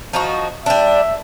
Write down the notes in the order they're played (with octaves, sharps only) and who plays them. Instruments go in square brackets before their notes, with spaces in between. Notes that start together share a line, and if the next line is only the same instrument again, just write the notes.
[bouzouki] F3 D#4 F#4
[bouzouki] G3 D4 [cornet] E5